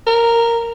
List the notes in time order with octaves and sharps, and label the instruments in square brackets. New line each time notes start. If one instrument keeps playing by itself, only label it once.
[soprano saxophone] A#4